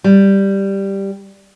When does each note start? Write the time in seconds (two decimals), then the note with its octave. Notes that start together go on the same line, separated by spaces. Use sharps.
0.04 G3